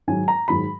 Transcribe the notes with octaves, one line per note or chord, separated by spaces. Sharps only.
G#2 D#3 F#3 G#5
A#5
G#2 D#3 F#3 B5